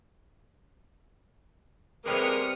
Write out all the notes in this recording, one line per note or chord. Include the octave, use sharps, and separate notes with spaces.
C3 G3 G#3 A#3 B4 D#6 F6 C#7